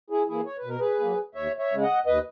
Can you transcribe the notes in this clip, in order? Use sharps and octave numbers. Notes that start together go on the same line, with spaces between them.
E4 G#4
E3 A#3 E4 G#4
C#5
B4
B2 A#4
G#4 B4
F#3 A#3
D#2 C#5 E5
C#5 E5
C#3 G#3
D#5 F#5
D#2 B4 D#5